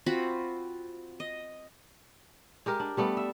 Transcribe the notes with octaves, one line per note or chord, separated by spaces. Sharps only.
C4 F4 F#4 B5
D#5
G#3 G4 A#4
D4
G3 A3 B3
E5